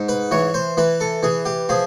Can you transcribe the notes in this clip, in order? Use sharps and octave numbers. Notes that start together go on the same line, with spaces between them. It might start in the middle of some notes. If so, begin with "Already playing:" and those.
Already playing: G#2
B4
E3 C#5
C5
E3 B4
A4
E3 G#4
G4
F3 G#4